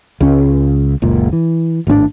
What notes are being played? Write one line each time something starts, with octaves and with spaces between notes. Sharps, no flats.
C#2 C#4
F#1 C#2 A#2
E3
G#1 A2 C4 D4